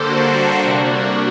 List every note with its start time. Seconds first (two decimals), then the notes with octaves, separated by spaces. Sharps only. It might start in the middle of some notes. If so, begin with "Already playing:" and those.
Already playing: D3 G3 A#3 A4 C5
0.09 D4 F#4
0.60 C3 G3 A#3